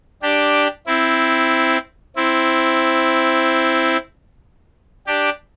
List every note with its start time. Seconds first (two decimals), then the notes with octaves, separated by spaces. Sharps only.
0.22 D4 G4
0.87 C4 E4
2.16 C4 E4
5.07 D4 G4